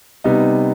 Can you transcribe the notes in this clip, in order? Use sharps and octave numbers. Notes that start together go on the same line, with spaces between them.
C3 G3 B3 D#4